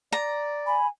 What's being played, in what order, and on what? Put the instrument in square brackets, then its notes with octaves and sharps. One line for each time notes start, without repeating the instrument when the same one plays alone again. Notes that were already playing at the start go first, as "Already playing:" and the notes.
[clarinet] D5 [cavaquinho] A#5
[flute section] G#5 [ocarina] B5